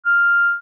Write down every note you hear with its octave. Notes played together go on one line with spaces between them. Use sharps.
F6